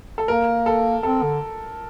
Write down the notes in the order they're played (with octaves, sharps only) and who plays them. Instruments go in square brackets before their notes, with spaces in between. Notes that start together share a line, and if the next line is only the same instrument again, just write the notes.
[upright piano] A4
[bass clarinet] A#3 [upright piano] A#4
[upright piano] A4
[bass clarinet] C4 [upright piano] A4
[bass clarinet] D3